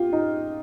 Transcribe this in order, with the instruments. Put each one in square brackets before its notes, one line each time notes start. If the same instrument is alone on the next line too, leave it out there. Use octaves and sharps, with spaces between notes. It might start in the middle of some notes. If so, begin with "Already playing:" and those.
Already playing: [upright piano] F4 G4
D#4